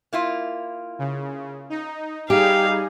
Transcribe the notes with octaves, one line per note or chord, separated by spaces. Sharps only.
A#3 E4 F4
C#3
D#4
G3 D#4 G4 G#4 F5